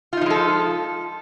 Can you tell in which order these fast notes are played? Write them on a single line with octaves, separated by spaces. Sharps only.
F4 D#4 F3 G#3 A4